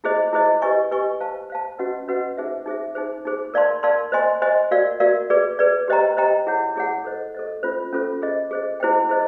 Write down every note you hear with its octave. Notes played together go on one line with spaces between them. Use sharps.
E4 G#4 C5 D#5
E4 G#4 C5 D#5
G4 B4 D#5 G#5 C#6
G4 B4 D#5 G#5 C#6
C5 F5 A5
C5 F5 A5
C#4 F#4 B4 D#5 F#5
C#4 F#4 B4 D#5 F#5
D#4 G#4 C5 E5
D#4 G#4 C5 E5
D#4 G#4 C5
D#4 G#4 C5
A#4 D5 F5 A5 C6
A#4 D5 F5 A5 C6
C5 D#5 G#5 C6
C5 D#5 G#5 C6
F#4 A#4 D5 F5
F#4 A#4 D5 F5
G#4 B4 D5
G#4 B4 D5
G4 C5 D#5 G5 A#5
G4 C5 D#5 G5 A#5
E4 G#4 C#5 F#5
E4 G#4 C#5 F#5
A4 C5 D#5
A4 C5 D#5
C#4 F4 A4 C5
C#4 F4 A4 C5
G#4 C5 D#5
G#4 C5 D#5
E4 G#4 C5 D#5 G5
E4 G#4 C5 D#5